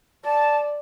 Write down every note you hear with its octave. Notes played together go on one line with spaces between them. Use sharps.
D5 A5